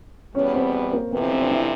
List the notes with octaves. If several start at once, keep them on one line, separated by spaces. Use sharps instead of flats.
E2 B2 G3 B3 C#4 C#5
C4 C5
A#3 A#4
F2 C3 E3 B3 B4
C4 C5
C4 C5
D4 D5
E4 E5